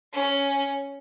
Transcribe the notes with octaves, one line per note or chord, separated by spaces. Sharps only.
C#4